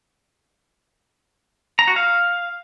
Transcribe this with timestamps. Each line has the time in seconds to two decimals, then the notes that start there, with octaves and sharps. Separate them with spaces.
1.79 A#5
1.88 F#4
1.96 F5